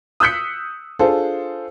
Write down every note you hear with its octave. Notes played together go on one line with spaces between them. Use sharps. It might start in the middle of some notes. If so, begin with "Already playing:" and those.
D#6 E6 F#6 G6 B6 C#7
D4 F4 G#4 A4 C5